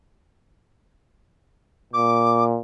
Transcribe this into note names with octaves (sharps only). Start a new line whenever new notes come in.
A#2 D6